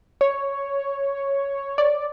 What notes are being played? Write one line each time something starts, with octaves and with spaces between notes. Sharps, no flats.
C#5
D5